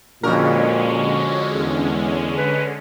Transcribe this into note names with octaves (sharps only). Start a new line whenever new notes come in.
F2 A#2 D3 G#3 C#4 F#4 A#4
E2
B4